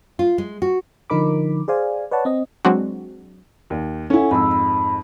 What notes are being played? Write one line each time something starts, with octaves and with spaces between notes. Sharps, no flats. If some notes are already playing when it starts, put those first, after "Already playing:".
F4
G#3
F#4
D3 F3 D#4 A#4 B5 D6
G#4 C5 D5 F5 G#5
B4 C#5 D5 F#5 A5
C4 D#5
F#3 G#3 C4 D4 F#4
D#2
C#4 E4 A4 F#5 G#5
F2 G#2 B5 E6
B5